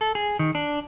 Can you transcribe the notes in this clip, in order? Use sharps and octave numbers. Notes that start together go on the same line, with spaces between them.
A4
G#4
D#3
D4